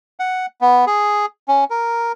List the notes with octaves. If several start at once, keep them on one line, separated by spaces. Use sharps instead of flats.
F#5
B3
G#4
C#4
A#4